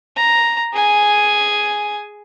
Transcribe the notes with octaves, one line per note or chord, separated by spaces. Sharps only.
A#5
G#4 G#5